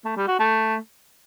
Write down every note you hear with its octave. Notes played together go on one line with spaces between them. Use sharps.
A3
G3
F#4
A3